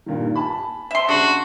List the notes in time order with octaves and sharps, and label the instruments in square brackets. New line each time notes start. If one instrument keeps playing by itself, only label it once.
[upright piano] G2 A#2 D#3
G#5 A5 B5
[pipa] E5 C6
[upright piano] C#3 F#7 [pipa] D4 [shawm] F#4